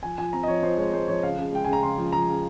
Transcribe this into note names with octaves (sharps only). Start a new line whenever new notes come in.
F3 G#5
F3 G#5
C4 A#5
D#5
F3 C#5
F3 C5
G#3 C#5
G#3 C5
F3 C#5
C#3 F5
C#3
G#3 G5
C#3 G#5
A#5
C#3 C6
F3
F3 A#5
C#3